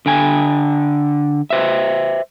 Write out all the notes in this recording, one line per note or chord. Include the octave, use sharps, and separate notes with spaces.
D3 G5 G#5
B4 C5 E5